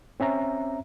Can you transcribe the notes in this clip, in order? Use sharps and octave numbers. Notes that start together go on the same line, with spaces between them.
C4 C#4 E5 A#5